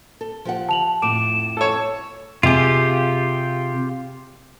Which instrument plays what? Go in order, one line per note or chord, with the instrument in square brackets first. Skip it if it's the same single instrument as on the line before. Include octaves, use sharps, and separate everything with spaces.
[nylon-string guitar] A4
F3 G4 F#5
[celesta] A5 F7 F#7
[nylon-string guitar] F2 A2 [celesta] D6 D7 [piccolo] E7
[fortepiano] A4 C#5
[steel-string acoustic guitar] C3 G#4 [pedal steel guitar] F4 G4